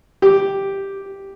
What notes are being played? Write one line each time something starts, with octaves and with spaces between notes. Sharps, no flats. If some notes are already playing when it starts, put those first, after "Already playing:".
G4